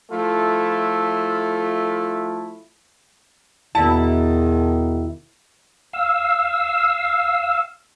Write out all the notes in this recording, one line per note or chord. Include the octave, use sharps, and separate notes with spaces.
F3 A3 E4 F4 A4
E2 B2 D#3 E4 A5
F5 E6